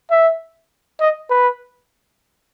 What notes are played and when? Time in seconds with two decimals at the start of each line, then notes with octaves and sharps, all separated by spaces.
0.11 E5
1.00 D#5
1.30 B4